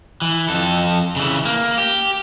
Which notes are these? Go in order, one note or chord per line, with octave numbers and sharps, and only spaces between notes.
E3
F2 A4
C#3 E3
A#3
G4